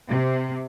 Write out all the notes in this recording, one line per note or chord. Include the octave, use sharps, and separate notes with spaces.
C3